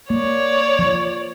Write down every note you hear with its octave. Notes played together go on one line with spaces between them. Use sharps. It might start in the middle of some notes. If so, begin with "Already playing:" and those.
A#3 C#5 D5
F3